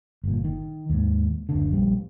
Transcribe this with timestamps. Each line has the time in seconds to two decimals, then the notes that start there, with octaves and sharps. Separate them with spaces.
0.24 G1 A#2
0.44 D#3
0.90 D#2 G#2
1.49 F#1 D2 D3
1.71 A#1 G3